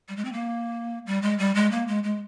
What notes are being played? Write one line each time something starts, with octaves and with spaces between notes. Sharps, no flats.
G3
G#3
C4
A#3
G3
G#3
G3
G#3
A#3
G#3
G#3